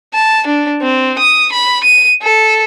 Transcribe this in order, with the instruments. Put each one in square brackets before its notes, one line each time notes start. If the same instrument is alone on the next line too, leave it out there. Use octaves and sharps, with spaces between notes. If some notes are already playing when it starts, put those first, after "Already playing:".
[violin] A5
D4
C4
D#6
B5
D#7
A4